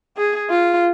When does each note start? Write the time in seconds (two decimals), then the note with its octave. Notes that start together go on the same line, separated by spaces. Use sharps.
0.17 G#4
0.50 F4